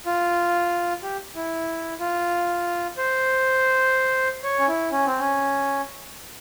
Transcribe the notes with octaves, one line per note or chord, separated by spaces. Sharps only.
F4
G4
E4
F4
C5
C#5
C#4
E4
C#4
C4
C#4